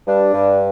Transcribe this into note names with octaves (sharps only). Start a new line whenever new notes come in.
G2 D4
G2